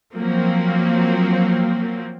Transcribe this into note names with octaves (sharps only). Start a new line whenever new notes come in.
F3 F#3 A#3 C4